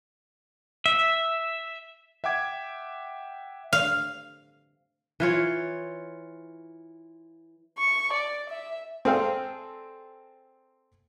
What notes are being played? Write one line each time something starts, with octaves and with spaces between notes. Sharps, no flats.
E5
E5 F#5 G5 D6 G#6
F5
E3 F4 C#5
C#6
D5
E5
C4 G#4 A4 D5 F5 G5